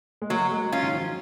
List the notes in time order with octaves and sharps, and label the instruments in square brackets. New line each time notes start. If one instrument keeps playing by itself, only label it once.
[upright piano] G#3
[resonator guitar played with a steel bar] F#3 [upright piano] A#3
[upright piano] G#3
[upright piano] F#3 [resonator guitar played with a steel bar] C#4 F4
[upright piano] D#3
F3